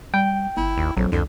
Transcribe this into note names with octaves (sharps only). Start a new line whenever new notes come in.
G3 G5
G1 E4
D#2
A#1 F2 F#3
C2 F2 D3